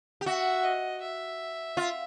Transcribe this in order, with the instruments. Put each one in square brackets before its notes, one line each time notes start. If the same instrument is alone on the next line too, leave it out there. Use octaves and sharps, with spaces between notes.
[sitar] G4
[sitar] F#4 [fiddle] E5
[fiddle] D#5
E5
[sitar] F4